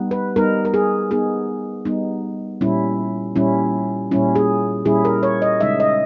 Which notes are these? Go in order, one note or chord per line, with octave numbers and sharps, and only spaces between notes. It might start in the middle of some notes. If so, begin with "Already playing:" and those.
Already playing: G3 B3 D#4
B4
G3 B3 D#4 A#4
A#4
G#4
G3 B3 D#4 G#4
G3 B3 D#4
A#2 G3 C#4 E4
A#2 G3 C#4 E4
A#2 G3 C#4 E4
G#4
A#2 G3 C#4 E4 G#4
A#4
C#5
D#5
C#3 G#3 D#4 E5
D#5